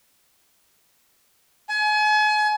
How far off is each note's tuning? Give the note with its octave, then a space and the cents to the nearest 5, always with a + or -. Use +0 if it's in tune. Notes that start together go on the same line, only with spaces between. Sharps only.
G#5 +35